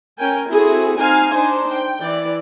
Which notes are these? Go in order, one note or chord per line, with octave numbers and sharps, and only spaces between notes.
C#4 A#4 G5 G#5
C4 E4 F#4 G#4 A4
C4 D#4 F5 G#5
D4 D#4 C5
G5
E3 D5